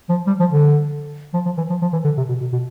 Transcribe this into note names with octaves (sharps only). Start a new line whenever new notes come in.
F3
G3
F3
D3
F3
F3
E3
F3
F3
E3
D3
C3
B2
B2
B2